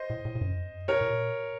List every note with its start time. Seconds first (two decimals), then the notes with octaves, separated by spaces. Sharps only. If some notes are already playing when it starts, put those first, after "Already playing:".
Already playing: C5 D#5
0.10 A2
0.25 A2
0.35 A2
0.41 F#2
0.57 F2
0.73 F#2
0.88 A2 A#4 C#5
1.01 A2
1.09 A#2
1.30 A2